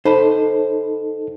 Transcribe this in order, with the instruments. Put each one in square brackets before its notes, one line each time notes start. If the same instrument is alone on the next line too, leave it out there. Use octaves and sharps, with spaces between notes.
[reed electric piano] D#4 A4 [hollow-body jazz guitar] C5 B5